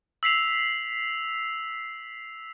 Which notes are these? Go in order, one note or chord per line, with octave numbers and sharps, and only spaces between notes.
E6 B6 C7 F7